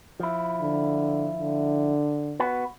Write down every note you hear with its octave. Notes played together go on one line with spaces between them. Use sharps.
F3 E4
D3
D3
B3 F#4 B4